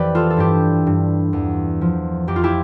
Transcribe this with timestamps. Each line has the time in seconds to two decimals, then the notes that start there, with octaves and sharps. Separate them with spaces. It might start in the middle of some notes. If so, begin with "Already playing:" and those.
Already playing: F2 E3 G4 B4 D5
0.15 F4 A4
0.30 A4
0.37 G2 E4 G4
0.87 G2
1.33 E2
1.81 F3
2.27 F2 G4
2.36 F4
2.43 E4 G4